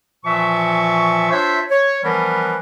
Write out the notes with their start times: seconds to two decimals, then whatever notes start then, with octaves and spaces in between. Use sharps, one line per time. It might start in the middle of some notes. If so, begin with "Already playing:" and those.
0.25 A#2 E3 F3 E5 C#6
1.31 D4 F4 C5 C#5 E5
1.70 C#5
2.04 E3 F3 G3 B3 A#4 B4